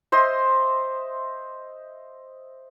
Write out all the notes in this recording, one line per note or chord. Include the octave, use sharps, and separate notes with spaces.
C5 D#5 E5 C6